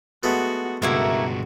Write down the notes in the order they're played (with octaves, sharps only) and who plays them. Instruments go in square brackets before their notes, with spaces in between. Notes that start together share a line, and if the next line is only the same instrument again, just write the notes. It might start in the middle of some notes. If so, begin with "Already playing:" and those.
[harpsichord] G#3 A3 B3 [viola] F#4
[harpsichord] C#2 [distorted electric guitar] G2 B2 [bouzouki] A3 A#3 E4 [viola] F#4